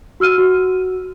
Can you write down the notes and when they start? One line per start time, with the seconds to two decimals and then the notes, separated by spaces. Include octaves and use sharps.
0.20 F#4 E6 F6 D#7
0.38 F#4